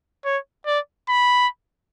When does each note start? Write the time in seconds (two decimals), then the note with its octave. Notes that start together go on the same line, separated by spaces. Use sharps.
0.25 C#5
0.67 D5
1.09 B5